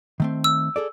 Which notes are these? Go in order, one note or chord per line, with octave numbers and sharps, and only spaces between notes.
D#3 A3 C4
E6
G#4 A4 D5